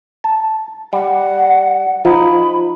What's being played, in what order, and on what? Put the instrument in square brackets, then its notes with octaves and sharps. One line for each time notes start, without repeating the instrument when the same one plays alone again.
[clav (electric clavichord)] A5
[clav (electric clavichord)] G3 [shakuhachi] F#5
[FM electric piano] F3 [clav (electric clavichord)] D#4 [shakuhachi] B5